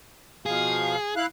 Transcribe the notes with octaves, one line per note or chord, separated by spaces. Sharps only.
B2 F3 G#4 F5
E4 F5 F#6